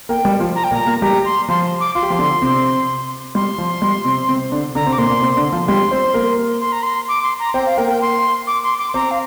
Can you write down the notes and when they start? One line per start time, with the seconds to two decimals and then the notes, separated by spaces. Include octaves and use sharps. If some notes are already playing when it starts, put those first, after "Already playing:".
0.09 A#3 A#4 G5
0.25 G3 G4
0.40 F3 F4
0.56 A#5
0.64 G5
0.71 A#2 A#3
0.74 A#5
0.86 A#3 A#4
1.02 G3 G4 A#5
1.25 C6
1.49 F3 F4 C6
1.80 D6
1.95 F4 C6
2.03 G4
2.10 F3 F4
2.19 D3 D4
2.42 C3 C4
3.35 G3 C6
3.58 F3
3.82 G3
4.04 C3 C4
4.28 C3 C4
4.52 D3 D4
4.75 D3 D4 A#5
4.86 C3 C4
4.93 D6
4.98 A#2 A#3 C6
5.10 A#2 A#3
5.21 C3 C4
5.37 D3 D4
5.52 F3 F4
5.68 G3 G4 C6
5.91 C4 C5
6.14 A#3 A#4
6.61 C6
6.72 A#5
6.83 C6
7.08 D6
7.23 C6
7.40 A#5
7.54 C4 C5 G5
7.66 F5
7.77 A#3 A#4 G5
7.90 G5
8.02 C6
8.47 D6
8.63 C6
8.78 D6
8.94 C4 C5 A#5
9.11 F5